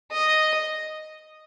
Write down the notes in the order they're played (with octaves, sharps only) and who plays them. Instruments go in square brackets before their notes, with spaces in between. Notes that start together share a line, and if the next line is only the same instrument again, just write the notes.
[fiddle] D#5